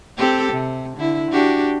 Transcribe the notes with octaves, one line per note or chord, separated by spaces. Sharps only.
C4 G4 A4
C3
D3 E4
D4 F#4 G4